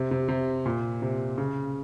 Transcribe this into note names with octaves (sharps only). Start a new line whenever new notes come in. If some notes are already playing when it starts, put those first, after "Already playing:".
Already playing: C3
C3
C3
A#2
C3
C#3